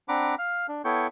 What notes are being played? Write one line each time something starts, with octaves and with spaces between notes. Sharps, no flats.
C4 D4 F#5 A#5 B5 D6
F5 F6
D4
B3 E4 A4 C#5 G5 C#6